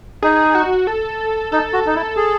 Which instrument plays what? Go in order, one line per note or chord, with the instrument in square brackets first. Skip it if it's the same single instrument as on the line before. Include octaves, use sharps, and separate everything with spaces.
[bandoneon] D#4 [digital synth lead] G#4
[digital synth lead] F#4
A4
[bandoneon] D#4 [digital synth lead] A4
[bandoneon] F#4
D#4
E4
G#4